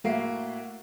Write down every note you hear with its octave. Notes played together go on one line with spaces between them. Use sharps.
A2 A#3 F#4 E5 C7